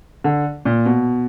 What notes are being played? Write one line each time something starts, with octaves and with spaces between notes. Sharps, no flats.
D3
A#2
B2